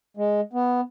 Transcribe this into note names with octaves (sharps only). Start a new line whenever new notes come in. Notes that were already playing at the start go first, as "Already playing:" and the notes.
G#3
B3